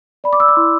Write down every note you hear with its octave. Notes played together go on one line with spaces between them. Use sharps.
D5 B5
D6
D5 E6
D6
E4 C6